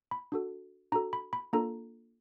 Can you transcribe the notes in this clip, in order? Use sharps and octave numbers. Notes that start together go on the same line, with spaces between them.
B5
D4 F#4 A4
D4 F#4 A4 A#5
B5
B5
A#3 D4 F4 A4 A#5